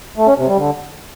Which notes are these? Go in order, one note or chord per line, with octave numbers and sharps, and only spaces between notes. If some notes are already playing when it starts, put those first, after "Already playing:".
A3
C#4
C3
G3
D3